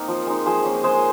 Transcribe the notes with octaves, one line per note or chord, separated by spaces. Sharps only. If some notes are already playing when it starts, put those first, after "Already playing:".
Already playing: A#3 C4 D#4 A#4
F3
G#3 D#4
F3 G#4 C5
A#3 C#4
G#3 G#4 C5